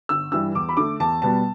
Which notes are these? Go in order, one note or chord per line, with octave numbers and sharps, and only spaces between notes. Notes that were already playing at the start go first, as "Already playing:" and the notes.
G1 E6
G2 E3 G3 E6
E2 D6
B5
D3 A3 D6
E2 A5
B2 G3 B3 A5